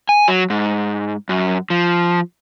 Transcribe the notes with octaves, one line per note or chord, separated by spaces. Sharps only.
G#5
F#3
G#2
F#2
F3